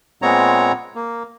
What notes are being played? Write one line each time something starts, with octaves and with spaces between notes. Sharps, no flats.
A#2 G#3 B3 C4 C#5 A#5
A#3